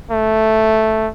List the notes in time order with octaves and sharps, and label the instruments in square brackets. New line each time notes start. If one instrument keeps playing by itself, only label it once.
[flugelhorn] A3